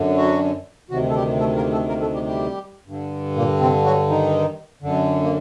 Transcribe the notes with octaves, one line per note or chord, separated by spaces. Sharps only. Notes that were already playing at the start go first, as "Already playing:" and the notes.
Already playing: F#2 D3
F#3 F#4
D2 C3 D#3 F#3 F#4
A4
G3 G4
A3 A4
A#3 A#4
A3 A4
A#3 A#4
A3 A4
G3 G4
G3 G4
G2 D3
A#2 A#3
C3 C4
F#3 F#4
D#3 D#4
F#2 D3
A#3